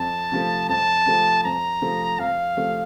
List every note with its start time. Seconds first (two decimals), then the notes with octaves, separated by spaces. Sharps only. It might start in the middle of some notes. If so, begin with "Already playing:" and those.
Already playing: F2 A5
0.32 C3 F3 A3
0.69 F2 A5
1.06 C3 F3 A3
1.44 F2 A#5
1.82 C3 F3 A3
2.19 F2 F5
2.57 C3 F3 A3